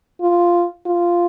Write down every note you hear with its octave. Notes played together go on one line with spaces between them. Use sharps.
F4
F4